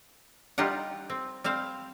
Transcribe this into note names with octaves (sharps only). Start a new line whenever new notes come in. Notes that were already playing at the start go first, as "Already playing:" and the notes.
G3 D#4 F4 G4 F#5
C4
G3 C4 C5 F5